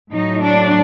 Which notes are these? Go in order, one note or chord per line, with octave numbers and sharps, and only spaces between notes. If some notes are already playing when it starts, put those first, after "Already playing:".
A2 F#3 A3 D#4
D4